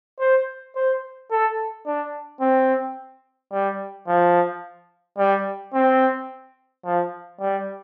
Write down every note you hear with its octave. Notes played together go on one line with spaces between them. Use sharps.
C5
C5
A4
D4
C4
G3
F3
G3
C4
F3
G3